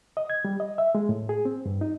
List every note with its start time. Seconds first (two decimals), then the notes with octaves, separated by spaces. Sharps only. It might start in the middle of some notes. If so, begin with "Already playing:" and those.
0.17 D#5
0.30 G#6
0.45 G3
0.60 D#5
0.78 E5
0.95 G#3
1.09 A2
1.29 G#4
1.45 C4
1.66 G2
1.81 D#4